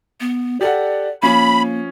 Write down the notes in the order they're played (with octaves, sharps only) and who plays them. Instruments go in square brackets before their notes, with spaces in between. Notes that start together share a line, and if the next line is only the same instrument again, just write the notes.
[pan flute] B3
[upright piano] G4 A4 F#5 [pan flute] D5
[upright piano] F3 C#4 [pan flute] A#3 [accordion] B5